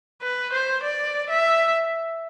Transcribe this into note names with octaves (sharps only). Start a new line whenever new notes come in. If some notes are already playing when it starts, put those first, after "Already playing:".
B4
C5
D5
E5